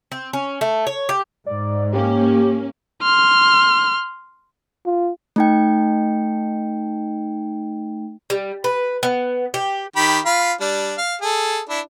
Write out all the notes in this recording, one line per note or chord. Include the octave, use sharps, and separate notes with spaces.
C4
C#4
A3
C#5
G4
G#2 D5
A#3 C#4 G4
C6 F6
F4
A3 D#4 G5
G3
B4
B3
G4
D#3 G4 B5
F4 F5 B5
G3 D4
F5
G#4 A4
D4 E4